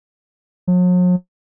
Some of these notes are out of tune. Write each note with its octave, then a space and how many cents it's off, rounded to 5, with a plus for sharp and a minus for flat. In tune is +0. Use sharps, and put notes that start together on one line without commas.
F#3 -45